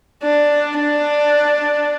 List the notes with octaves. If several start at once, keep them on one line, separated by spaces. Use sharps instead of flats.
D4
D4